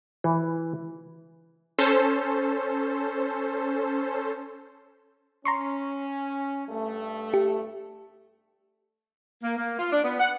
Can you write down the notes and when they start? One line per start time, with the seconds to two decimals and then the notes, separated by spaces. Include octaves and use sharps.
0.24 E3
1.79 C#4 A4 C5
5.45 C#4 A#5 C6 C#6
6.69 G2 A3
7.34 G4
9.43 A#3
9.57 A#3
9.79 F4
9.92 D4
10.04 B3
10.20 F#5